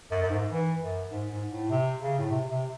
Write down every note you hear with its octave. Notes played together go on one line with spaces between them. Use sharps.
F#2
F#2
G#2
E3
F#2
G#2
G#2
A2
C3
C#3
A2
C3
C3